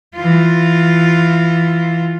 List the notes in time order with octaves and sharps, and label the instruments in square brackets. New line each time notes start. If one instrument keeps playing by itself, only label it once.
[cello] E3 F4